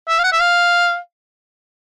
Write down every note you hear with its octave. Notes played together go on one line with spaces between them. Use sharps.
E5
F5
F#5
E5
F5